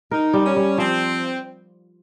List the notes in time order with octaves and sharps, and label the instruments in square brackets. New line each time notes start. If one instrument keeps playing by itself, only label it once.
[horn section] D#4 [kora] A#4
[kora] G3
[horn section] C#4
[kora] G3
[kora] F3 [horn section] C4